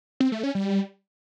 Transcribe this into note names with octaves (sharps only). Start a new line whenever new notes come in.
C4
A3
C#4
G3